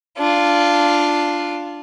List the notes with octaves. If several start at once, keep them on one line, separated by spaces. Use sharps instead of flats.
D4 F4